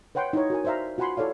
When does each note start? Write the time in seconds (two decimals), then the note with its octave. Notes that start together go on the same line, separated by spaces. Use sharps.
0.15 B4 C#5 F#5 G5 C6
0.33 D#4 E4 C#5
0.50 F#4 A#4 G#5
0.65 C5 D5 E5 F5 A#5
0.98 F4 F#4 F#5 G#5 B5 C6
1.17 E4 A4 C#5 D5 F5